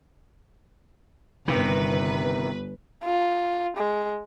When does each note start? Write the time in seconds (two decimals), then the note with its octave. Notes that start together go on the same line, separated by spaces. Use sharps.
1.48 G1 C3 D#3 B4
3.04 F4
3.77 G#3